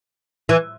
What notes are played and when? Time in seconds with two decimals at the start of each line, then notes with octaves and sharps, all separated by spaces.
0.49 E3